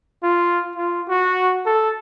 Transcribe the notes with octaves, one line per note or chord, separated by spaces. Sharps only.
F4
F4
F#4
A4